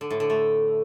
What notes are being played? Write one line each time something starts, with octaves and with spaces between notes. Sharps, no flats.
D3
A2
D3
A3